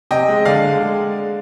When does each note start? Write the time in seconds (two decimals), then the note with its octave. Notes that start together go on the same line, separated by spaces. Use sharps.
0.11 C3 D#5 G5
0.28 G#3
0.45 D3 D5 F5
0.64 G#3
0.81 G#3